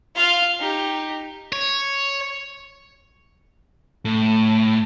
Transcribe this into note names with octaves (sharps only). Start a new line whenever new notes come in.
F4 F5
D#4 G4
C#5
A2